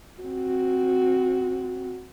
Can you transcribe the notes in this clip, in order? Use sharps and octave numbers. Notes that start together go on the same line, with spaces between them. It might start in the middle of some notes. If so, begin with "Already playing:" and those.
C4 F#4